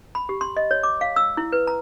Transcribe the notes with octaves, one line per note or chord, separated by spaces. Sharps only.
B5
G4
C6
D#5
C#5
D6
F5
E6
E4
B4
A#5